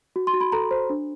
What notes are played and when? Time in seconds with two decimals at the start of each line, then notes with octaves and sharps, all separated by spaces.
0.16 F#4
0.27 C6
0.34 F#4
0.41 B5
0.52 A4 A#5
0.71 C5
0.90 D4